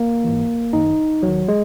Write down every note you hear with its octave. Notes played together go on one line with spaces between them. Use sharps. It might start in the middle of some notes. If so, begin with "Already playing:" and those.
Already playing: A#3
G#2 E3
F#2 D#3 D#4
D#2 F#3
D#3
G#3